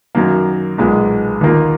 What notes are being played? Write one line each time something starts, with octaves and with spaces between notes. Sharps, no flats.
F#2 D#3 F#3 A#3
B1 A#2 G#3
D#2 D#3 A#3 F4